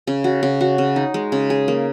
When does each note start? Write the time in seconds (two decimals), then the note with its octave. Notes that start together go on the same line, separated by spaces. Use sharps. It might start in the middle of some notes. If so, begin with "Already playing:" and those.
0.07 C#3
0.24 F#4
0.43 C#3
0.61 F#4
0.78 C#3
0.96 D#4
1.14 G#3
1.32 C#3
1.50 G#4
1.68 A#3